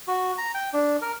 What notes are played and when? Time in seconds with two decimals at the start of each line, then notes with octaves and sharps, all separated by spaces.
0.08 F#4
0.38 A#5
0.54 G5
0.73 D4
1.02 A#4